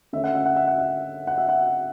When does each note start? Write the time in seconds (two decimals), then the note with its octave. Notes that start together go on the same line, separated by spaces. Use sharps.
0.13 D3 A3 C#4 E5
0.24 F#5
0.35 E5
0.46 F#5
0.56 E5
0.67 F#5
0.78 E5
1.27 F#5
1.38 E5
1.49 F#5